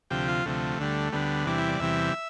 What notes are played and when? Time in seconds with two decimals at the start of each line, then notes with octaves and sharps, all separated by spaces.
0.10 D2 C3 F3 G4
0.28 F4
0.45 D2 C3 F3 A3
0.79 D2 D3 G3
1.12 D2 D3 G3 B3
1.46 E2 C3 E3 G3 D4
1.58 E4
1.69 D5
1.79 E2 C3 E3 G3 E5